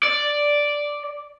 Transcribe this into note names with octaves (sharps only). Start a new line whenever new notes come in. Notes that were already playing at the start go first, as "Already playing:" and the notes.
D5